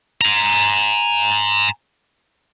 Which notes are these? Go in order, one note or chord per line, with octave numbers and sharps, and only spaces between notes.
G#5 A#5